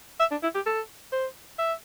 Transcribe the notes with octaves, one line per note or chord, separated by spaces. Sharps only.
E5
D4
E4
G4
A4
C5
E5